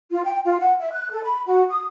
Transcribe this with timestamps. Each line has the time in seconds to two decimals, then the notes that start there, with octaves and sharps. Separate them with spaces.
0.11 F4
0.24 G5
0.44 F4
0.60 F#5
0.79 E5
0.92 F#6
1.11 A4
1.23 B5
1.46 F#4
1.69 D#6